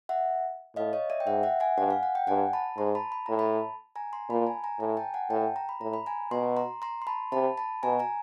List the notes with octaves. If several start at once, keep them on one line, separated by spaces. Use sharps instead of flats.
E5 F#5
A2 D#5 F5
C#5 D#5
D5 E5
G5
G#2 E5 F#5
E5 F#5
F#5 G#5
G2 F#5 G#5
F5
F#5
G5
G2 F#5 G#5
A5 B5
G#2 A#5 C6
A5 B5
B5
A2 A#5
A5 B5
G#5 A#5
A#5 C6
A#2 A5 B5
G#5 A#5
G#5 A#5
A2 G#5 A#5
G5 A5
F#5 G#5
A2 G5 A5
A#5
B5
A2 A#5
B5
G#5 A#5
B2 A#5 C6
A#5 C6
A#5 C6
C6
A5 B5
C3 A5 B5
A5 B5
B2 G#5 A#5
G#5 A#5